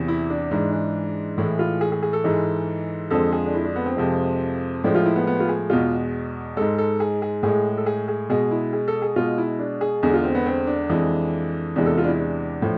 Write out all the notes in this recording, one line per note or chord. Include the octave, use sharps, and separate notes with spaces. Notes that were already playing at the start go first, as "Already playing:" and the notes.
Already playing: E2 C3 E3
E4
D4
G#2 E3 G#3 D4
D4
A2 E3 G#3 E4
F4
G#4
G#4
G#4
A4
G#2 E3 G#3
F2 D3 F3 G#3 A4
G#4
D4
E4
D4
B3
C4
F2 C3 F3 G#3
A2 F3 G#3 D4
F4
E4
B3
B3
F4
G#4
E2 B2 G#3 F4
G#2 G#3 A4
A4
G#4
G#4
A2 G#3 G#4
A4
G#4
G#4
B2 G#3 G#4
E4
G#4
A4
G#4
B2 G#3 F4
E4
D4
G#4
E2 D3 G#3 G#4
F4
C4
B3
C4
D4
F2 E3 G#3
E2 C3 E3 G#3 D4
A4
F4
D4
E4
D4
A2 F3